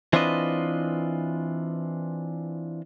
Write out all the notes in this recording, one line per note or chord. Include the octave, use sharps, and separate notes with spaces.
E3 C4 D4 F4 B4 D#5